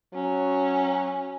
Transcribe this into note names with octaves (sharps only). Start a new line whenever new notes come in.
F#3 C#4